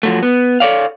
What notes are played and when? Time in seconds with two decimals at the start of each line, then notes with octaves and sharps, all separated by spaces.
0.03 F3 F#3 A3
0.23 B3
0.60 A4 C#5 D5 F5